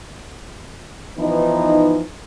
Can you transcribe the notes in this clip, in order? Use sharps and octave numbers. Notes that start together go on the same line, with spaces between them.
E3 F3 B3 D#4